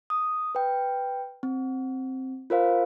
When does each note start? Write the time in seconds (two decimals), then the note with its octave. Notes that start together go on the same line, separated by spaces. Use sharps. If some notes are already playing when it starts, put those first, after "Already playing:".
0.10 D#6
0.55 B4 G5
1.43 C4
2.50 F4 A#4 C5 F5